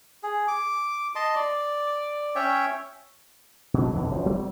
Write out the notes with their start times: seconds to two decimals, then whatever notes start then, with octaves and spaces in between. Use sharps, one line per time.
0.23 G#4
0.48 D6
1.15 D#5 A5 C6
1.35 D5
2.36 C#4 C#5 E5 G5
3.74 B2 F#3
3.93 F2 B2 D3 E3
4.11 E1 F#2 F3 F#3
4.26 F#3 G3 C4